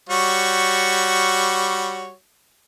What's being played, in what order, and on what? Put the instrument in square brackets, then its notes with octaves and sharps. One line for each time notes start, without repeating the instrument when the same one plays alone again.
[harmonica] G3 F#4 C#5